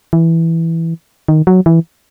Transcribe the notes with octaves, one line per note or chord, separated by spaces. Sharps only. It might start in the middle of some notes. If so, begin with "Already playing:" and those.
E3
D#3
F#3
E3